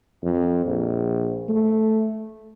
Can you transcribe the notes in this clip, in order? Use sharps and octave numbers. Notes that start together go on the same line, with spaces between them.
F2
A#1
A3